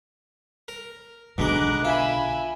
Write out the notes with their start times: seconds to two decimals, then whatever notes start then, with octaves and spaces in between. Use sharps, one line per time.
0.68 A#4
1.38 B1 B2 D3 G#3 D#5 A#5 D6 F#6
1.85 F4 E5 G#5 B5